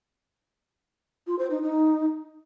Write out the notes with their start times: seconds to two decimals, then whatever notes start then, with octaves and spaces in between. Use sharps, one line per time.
1.27 F4
1.39 C5
1.51 D#4
1.62 D#4